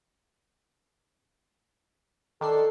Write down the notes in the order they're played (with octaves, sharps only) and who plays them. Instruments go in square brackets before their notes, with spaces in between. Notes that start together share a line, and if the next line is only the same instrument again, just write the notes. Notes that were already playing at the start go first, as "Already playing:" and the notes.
[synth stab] D#3 D4 C7 [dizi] A4